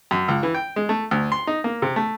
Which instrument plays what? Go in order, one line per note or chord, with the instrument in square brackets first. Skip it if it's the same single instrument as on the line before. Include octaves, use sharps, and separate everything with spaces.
[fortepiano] F#2
C#2
E3
G5
G#3
A3
D2
C6
D#4
A#3
C3
A3